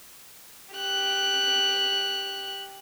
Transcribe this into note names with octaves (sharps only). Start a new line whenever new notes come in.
G4 F#6